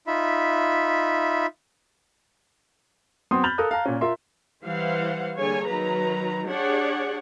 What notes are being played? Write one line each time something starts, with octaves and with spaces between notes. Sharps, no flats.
D#4 F4 E5 B5
F#2 B3 C4 C5 C6 D#6
B5 F6 G6 A6 F7 F#7
A4 A#4 F5 A#5 D#6 F#6
F5 A5 A#5
A#2 C#4
F4 A#4 E5 C6
E3 G3 C5 F5 F#5
D3 G3 A#3 G#4 C#5 G#5
D#3 F#3 B4 A#5
D4 G4 G#4 C#5 D5 F#5